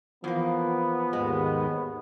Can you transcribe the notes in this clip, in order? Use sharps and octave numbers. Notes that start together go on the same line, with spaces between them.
E2 F3 A#3 B3
D#2 G#2 D#3 G#3